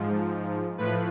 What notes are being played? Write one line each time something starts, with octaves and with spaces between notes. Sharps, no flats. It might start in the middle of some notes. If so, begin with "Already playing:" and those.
Already playing: G#2 F3
A2 F3 B4